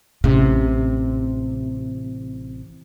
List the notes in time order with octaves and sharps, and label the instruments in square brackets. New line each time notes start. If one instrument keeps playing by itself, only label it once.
[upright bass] A1 C3